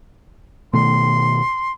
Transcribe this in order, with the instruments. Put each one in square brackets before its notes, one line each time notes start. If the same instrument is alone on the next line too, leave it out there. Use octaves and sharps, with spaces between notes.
[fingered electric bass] B2 D#3 A3 [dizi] C6